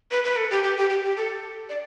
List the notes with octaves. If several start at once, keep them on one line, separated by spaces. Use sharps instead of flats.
B4
B4
A4
G4
G4
G4
G4
G4
A4
D5